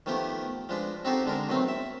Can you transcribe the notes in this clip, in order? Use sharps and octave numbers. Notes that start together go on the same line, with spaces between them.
D#3 F3 A3 B3 G4
F3 G#3 D4 B4
C4 D#4 F#4 G4 A4 C5
D3 G#3 D4 A#4
B2 D#3 F#3 A3 C4
E5